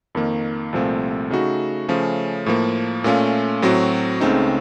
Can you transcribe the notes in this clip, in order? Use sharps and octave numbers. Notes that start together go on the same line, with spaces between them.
F2 D#3 A#3
C2 A#2 F3 A3 C4
C#3 A3 D#4 F#4
C#3 F3 A3 C#4
A2 F3 A#3
A#2 A3 C#4 F4
A2 F#3 C4 F#4
C#2 C#3 A3 C4 D#4